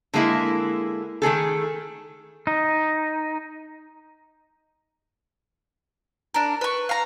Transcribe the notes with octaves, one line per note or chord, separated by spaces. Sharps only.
D3 G#3 A#3 E4
D#3 A3 G#4 A4
D#4
D4 A#4
B4 C#6
F5 A#5